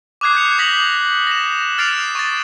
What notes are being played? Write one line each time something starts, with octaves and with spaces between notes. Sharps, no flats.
D6 D#6 F#6 G#6 C7
G6 G#6 C#7 F7
D6 D#6 A#6 B6 F#7
A#6 E7
F6 A6 C7 D7 E7 F7
C#6 A6